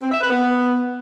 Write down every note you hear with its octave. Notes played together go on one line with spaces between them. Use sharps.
C4
E5
B4
B3